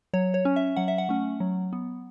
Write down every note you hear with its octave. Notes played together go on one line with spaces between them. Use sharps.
F#3 C#5
C#5
C#4
E5
F#3 F#5
E5
F#5
A3 C#4
F#3
B3